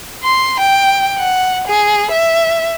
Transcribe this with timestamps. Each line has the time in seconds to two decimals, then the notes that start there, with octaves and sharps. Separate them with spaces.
0.23 C6
0.60 G5
1.19 F#5
1.68 G#4
2.11 E5